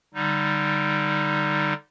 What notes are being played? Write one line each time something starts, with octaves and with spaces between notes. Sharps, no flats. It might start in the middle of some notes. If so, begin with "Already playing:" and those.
D3 G3 D#4